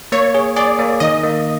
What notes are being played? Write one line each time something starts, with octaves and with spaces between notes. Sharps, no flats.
A#3 C#5
G#4
G#4 D5
A#3
D#3 D#5
A#3